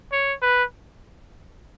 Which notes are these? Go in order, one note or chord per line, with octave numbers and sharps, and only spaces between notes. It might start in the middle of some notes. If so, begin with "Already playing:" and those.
C#5
B4